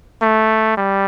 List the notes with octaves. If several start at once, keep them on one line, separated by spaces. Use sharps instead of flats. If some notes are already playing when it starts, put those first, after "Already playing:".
A3
G3